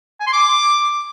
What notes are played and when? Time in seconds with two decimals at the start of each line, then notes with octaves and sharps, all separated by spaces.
0.20 G#5
0.27 C6
0.33 D6